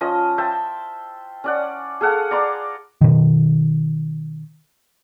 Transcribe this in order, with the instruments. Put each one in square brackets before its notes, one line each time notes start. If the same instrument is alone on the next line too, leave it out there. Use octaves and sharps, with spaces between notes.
[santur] F3 C#4 D#5
C5 E5 G5 A5
C#4 D5 F#5
G#4 A4 F5 F#5
D5 A#5 C6 D6
[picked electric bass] B2 D#3